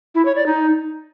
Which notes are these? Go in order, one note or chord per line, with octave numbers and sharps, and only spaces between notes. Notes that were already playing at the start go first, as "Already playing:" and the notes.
E4
C#5
D5
D#4